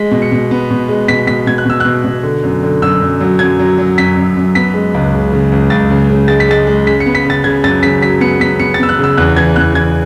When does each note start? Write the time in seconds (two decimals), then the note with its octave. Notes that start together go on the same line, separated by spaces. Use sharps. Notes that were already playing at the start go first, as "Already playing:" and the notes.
Already playing: G#3 B6
0.11 B2
0.22 C#7
0.32 B2
0.51 B3
0.70 B2
0.88 G#3
1.08 B2 B6
1.27 B2 B6
1.47 B2 G#6
1.58 F#6
1.66 B2 E6
1.80 B2 F#6
2.04 B2
2.23 D3
2.43 F#2
2.63 D3
2.82 F#2 E6
3.02 F#2
3.20 F#3
3.39 F#2 G#6
3.59 F#3
3.78 F#3
3.98 F#2 B6
4.17 F#2
4.36 F#2
4.55 B3 B6
4.74 G#3
4.94 C#2
5.14 C#3
5.33 C#3
5.52 C#2
5.70 C#2 A6
5.90 C#3
6.10 C#3
6.28 G#3 A6
6.40 B6
6.48 G#3 A6
6.67 G#3
6.86 C#3 B6
7.00 C#7
7.06 B3
7.15 B6
7.25 C#3 A6
7.44 C#3 G#6
7.64 F#2 A6
7.83 C#3 B6
8.02 F#3 B6
8.21 B3 C#7
8.40 B3 B6
8.60 B3 C#7
8.74 A6
8.79 B3 E6
8.89 F#6
8.99 C#3 E6
9.17 E2 F#6
9.36 E3 G#6
9.56 E2 F#6
9.75 E3 G#6